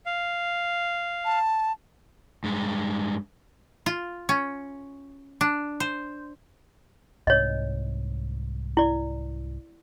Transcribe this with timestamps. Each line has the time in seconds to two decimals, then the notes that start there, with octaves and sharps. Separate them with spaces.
0.06 F5
1.25 A5
2.44 G2 G#3
3.86 F4
4.29 C#4
5.41 D4
5.80 C5
7.27 C2 G#2 C#5 D#5
8.77 E4 D5